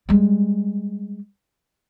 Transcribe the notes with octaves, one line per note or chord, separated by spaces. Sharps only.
G3 G#3